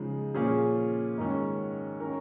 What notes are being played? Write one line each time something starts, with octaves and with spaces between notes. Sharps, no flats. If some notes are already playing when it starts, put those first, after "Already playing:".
Already playing: C#3 F3 G#3 D#4
A#2 F3 C#4 F4 G#4
G#2 D#3 C#4
D#3 C#4 A#4